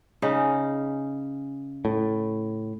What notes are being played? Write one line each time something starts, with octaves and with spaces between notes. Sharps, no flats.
C#3 C#4 D#4
A2